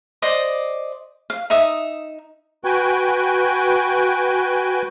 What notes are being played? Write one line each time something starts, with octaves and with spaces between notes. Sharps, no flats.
C5 D5 D#5 D#6
F5
D#4 E5 D#6
F#4 B4 G5 G#5